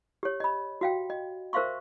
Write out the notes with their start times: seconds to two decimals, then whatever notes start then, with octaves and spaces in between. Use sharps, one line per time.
0.23 G4 C#5
0.40 D#5 B5
0.81 F#4 F5 G5
1.10 D#5
1.53 A#4 C5 E5 F5 C6 C#6